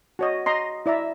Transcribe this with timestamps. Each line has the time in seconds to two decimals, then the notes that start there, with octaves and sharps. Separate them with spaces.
0.19 F#4 C#5 D#5
0.46 D#5 A#5 C6
0.86 E4 D5 E5 A#5